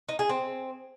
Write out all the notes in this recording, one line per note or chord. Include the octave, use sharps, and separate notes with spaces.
D#4
G#4
C4